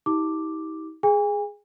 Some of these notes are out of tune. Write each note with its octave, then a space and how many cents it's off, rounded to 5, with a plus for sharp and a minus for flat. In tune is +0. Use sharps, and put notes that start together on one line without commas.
D#4 +45 G4 -15 D6 +0
G#4 +0 G#5 -40